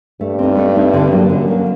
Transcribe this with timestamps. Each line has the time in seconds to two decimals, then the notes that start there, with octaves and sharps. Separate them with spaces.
0.21 G2 A3
0.39 C4 D#4
0.57 A3
0.75 C4 D#4
0.93 D3
1.12 F#3 A#3
1.29 F#2 D3
1.47 F#3 A#3